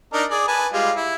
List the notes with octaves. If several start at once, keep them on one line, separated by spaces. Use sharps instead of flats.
D4 D#4 A#4
G#4 D5
B4 G#5 A5
G3 G#3 F4
E4